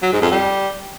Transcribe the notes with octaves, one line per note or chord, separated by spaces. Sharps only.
F#3
G#2
F2
G3